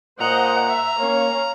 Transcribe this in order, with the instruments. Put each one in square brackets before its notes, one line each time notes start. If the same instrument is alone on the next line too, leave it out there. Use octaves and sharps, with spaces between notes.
[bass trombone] A#2 [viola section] C5 D#5 F#5 [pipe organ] A#5
[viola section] E5
[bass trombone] A#3 [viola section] C#4 C#5 F5